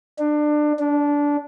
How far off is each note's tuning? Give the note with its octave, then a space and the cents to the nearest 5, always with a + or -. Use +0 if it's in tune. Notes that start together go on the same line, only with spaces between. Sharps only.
D4 +25
D4 -15